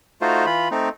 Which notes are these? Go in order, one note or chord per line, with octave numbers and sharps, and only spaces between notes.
A3 D#4 F4 F#4 C5
E3 F4 B5
A3 C4 D#4